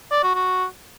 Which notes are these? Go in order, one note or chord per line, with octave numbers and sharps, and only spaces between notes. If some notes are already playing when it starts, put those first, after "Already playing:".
D5
F#4
F#4